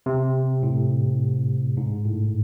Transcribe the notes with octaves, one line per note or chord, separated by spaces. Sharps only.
C3
A2
G#2
A2